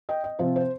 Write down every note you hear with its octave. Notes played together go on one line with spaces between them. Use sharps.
D#5 G5
D#5
C3 F3 C4 F4 C5
C5